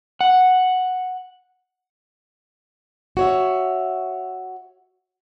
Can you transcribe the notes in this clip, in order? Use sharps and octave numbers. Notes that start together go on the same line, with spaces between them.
F#5
F#4 C#5 E5